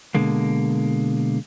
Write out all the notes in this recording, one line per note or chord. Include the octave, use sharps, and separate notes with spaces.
B2 D3 G#3 A#3